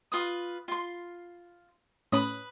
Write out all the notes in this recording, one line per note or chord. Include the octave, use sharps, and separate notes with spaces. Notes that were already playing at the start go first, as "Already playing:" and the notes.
F4 B4 D#6
F4 C6
A2 C#4 B4 B5 D#6